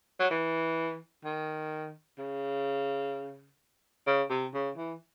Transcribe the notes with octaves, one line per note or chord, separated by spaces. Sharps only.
F#3
E3
D#3
C#3
C#3
C3
C#3
E3